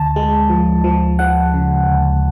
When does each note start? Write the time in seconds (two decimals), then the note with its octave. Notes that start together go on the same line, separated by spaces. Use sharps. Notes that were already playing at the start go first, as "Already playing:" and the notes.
Already playing: D2 A5
0.16 G#3
0.50 F3
0.84 F3
1.19 F3 F#5
1.54 C#3
1.88 D2